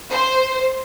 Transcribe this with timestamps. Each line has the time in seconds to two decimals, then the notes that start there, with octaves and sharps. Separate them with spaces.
0.11 C5